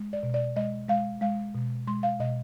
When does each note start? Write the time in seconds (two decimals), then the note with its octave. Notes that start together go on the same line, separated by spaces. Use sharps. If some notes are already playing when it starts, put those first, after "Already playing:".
Already playing: G#3
0.13 D5
0.23 B2
0.34 D5
0.56 G#3 D#5
0.89 G#3 F5
1.21 G#3 F5
1.55 B2
1.87 G#3 C6
2.03 F5
2.20 B2 D#5